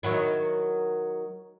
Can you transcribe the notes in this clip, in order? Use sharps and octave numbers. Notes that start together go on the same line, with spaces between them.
D#3 F#3 E4